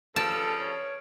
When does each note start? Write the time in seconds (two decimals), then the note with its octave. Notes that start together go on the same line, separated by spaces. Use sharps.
0.16 G2 C#3 F3 A4 A5 F6 D7
0.60 C#5